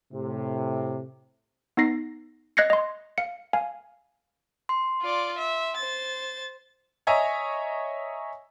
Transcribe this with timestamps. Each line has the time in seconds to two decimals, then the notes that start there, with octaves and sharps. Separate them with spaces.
0.13 A2 C3
1.77 B3 D#4 A#6 C7
2.57 D#5 F#6 G#6 A#6 C7 C#7
2.70 D#5 C6
3.18 F5 C#7
3.53 F5 G#5
4.69 C6
5.02 F4 D5
5.38 E5
5.77 C5 A6
7.07 C#5 D#5 E5 G#5 A#5